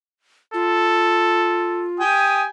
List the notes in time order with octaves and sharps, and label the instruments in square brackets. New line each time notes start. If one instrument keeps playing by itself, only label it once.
[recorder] F4 [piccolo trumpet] A4
[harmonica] G4 G5 G#5 [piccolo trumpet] D#6